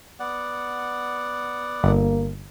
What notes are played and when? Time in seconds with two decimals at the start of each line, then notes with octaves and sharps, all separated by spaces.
0.20 B3 D5 F#5
1.84 G1 A#3